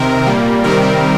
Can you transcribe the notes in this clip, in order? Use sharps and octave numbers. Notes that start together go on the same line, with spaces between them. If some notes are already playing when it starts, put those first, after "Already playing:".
Already playing: C3 D#3 C4 A#4
A#2 G3 A#3
C3 D#3 G3 C4 A#4